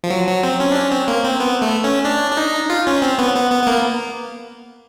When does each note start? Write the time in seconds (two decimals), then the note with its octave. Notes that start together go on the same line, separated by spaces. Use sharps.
0.04 F3
0.10 F#3
0.28 F#3
0.43 C4
0.60 C#4
0.72 D4
0.76 C#4
0.92 C4
1.08 A#3
1.24 C4
1.40 B3
1.62 A3
1.84 C#4
2.05 D4
2.31 D4
2.37 D#4
2.70 F4
2.87 C#4
3.02 C4
3.18 B3
3.35 B3
3.51 B3
3.63 B3
3.67 A#3